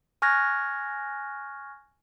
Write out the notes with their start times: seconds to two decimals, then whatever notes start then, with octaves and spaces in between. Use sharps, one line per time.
0.22 G#5 C#6 F6 F#6 G#6 A#6